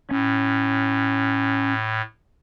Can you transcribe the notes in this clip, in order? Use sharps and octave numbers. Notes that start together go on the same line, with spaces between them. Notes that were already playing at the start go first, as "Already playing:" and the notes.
A2 C#4